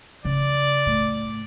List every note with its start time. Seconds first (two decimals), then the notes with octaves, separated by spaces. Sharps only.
0.25 C#3 D5
0.86 A2